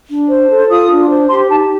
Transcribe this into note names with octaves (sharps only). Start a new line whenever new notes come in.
D4
C5
A4
F4 D#6
D4
C5
G4 C6
D#4 A5